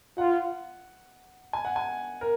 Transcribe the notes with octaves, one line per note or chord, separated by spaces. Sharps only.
F4 F#5
G#5
F#5
G#5
A#4